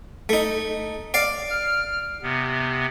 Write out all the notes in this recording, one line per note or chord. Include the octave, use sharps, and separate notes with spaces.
A3 D#4
D5 F5
F6
C3 B3